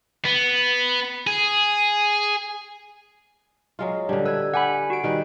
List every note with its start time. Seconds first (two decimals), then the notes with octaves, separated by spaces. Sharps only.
0.25 B3
1.27 G#4
3.79 F#3 G#3 F4
4.09 D3 G3 D4
4.25 B4 E6 G#6
4.54 G4 F#5 G#5 B5
4.90 F#4 D7
5.04 D#3 G3 B4